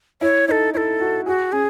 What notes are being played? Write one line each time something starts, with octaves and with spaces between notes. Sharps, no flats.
E4 C#5
D#4 C#5
A4
E4 A4 C#5
F#4
F#4 G#4
C#4 G#4